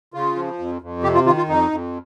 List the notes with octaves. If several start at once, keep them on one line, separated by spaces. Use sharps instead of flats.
C#3 F4
F3
F2
F2
C3 G4
F4
D#3 F4
F4
F2 D#4
F2